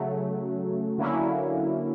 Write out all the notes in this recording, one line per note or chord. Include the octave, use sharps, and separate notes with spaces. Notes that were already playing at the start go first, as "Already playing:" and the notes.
Already playing: C#3 F#3 A3
D3 F#3 A#3 C#4 E4